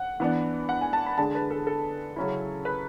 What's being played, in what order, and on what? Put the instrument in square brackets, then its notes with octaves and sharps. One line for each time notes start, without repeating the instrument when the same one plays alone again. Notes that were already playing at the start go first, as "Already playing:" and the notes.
Already playing: [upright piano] F#5
E3 B3 D4
F#5
G#5
A5
B5
D3 G#3 D4 A5
B4
A4
A4
C#3 F#3 C#4 E4
B4